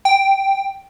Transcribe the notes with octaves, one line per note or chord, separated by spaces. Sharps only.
G5